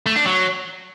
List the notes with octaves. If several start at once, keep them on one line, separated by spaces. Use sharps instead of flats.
A3
D4
F#3